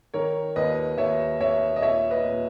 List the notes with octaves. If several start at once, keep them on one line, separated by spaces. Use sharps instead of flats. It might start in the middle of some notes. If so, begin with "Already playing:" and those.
D#3 A#4 C#5
D#2 B4 D#5
D#2 C#5 E5
D#2 C#5 E5
D#5
A#2 C#5 E5
B4 D#5
A#2